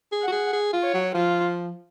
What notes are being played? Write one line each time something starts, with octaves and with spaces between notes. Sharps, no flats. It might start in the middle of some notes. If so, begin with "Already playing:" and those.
G#4
F#5
F#4
G#4
G#4
F4
C#5
F#3
F3 F4